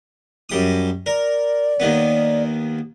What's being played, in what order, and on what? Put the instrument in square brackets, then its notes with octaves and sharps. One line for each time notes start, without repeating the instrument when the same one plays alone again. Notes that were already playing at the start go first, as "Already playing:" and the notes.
[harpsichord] F#2 G3 D#6
[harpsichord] A#4 [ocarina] D5
[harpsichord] D#2 D#3 B3